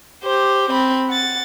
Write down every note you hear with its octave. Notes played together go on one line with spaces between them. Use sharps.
G4 C5
C4 B5
F#5 A6